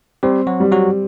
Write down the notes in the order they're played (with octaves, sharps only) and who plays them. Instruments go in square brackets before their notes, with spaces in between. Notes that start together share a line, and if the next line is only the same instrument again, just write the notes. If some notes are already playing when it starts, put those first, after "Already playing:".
[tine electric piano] G3 G4 [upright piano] C4
[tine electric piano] F#3 F#4
[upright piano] G3
[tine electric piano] F#3 F#4